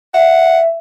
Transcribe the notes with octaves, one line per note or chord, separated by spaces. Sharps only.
E5 F#5